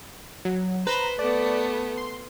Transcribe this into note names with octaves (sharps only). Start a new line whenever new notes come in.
F#3
B4 C5 A#5
A3 B3 D5
C6